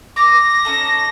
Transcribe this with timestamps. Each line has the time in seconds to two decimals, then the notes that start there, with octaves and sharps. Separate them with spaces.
0.16 D6 A#6
0.65 C#4 D#4 A4